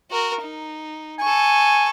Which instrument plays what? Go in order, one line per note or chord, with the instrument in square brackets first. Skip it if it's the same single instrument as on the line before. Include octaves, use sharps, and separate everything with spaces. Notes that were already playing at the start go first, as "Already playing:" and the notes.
[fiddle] F#4 A#4
D#4
[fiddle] A4 C#6 [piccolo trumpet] G#5